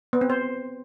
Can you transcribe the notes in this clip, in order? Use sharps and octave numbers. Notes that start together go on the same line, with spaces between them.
B3
C4
C5